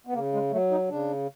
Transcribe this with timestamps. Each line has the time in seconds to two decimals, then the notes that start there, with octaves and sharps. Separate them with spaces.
0.07 B3
0.14 C#3 A#3
0.33 G#3
0.51 F#3 A3
0.71 D#4
0.89 C#3 D4